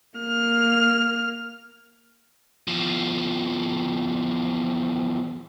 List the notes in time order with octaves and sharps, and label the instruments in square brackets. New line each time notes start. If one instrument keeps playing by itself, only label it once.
[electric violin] A#3 F6
[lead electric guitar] E2 F3